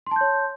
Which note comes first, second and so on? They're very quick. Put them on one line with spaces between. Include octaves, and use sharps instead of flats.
C6 A5 G6 C#5